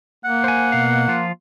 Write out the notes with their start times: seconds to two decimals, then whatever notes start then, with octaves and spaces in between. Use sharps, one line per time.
0.25 A#3 F#5
0.44 C5 G#5
0.72 B2 F5
1.08 F3 F4